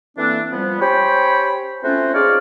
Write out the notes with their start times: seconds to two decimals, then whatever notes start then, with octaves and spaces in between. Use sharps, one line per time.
0.18 E3 A3 A#3 C4 D4
0.51 F3 G3 B3
0.80 C#4 G4 C5 C#5 G5 B5
1.82 A3 C4 C#4 F4 F#4 C5
2.13 D#4 F4 G#4 C#5 D5 F5